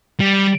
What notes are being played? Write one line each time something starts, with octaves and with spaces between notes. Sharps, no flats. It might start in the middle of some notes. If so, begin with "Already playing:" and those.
G3